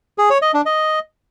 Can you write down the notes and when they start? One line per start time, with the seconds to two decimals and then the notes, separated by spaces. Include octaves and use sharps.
0.18 G#4
0.30 C#5
0.42 D#5
0.54 D4
0.66 D#5